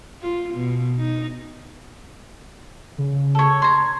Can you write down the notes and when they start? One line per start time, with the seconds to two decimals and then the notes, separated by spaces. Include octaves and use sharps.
0.22 F4
0.54 B2
0.98 D#4
2.98 C#3
3.35 A4 C#5
3.62 A#5 C6 G#6